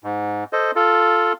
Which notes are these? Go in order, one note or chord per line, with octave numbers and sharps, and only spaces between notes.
G#2
A4 C5 D#5
F4 A4